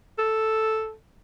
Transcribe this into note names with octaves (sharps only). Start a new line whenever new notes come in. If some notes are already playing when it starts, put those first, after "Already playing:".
A4